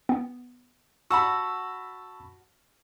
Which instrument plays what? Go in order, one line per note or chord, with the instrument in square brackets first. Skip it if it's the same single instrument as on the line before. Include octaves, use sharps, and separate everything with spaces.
[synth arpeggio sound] B3
[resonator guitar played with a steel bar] F#4 F#5 [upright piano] A5 B5 [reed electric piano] C#6 E6